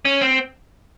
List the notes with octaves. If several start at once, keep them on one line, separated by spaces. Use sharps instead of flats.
C#4
C4